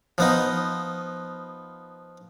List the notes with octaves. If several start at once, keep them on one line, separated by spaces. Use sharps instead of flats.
F3 B3 D#4